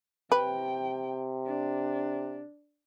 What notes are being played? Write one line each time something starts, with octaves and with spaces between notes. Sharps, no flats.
C3 B4 G5
D4